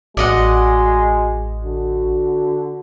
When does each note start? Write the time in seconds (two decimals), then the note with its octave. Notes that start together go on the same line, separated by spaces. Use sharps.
0.17 A1 G#3 F#4 D5 D#5 F#5
1.65 D3 F#4